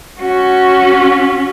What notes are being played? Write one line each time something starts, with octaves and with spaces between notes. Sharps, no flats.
C#4 F#4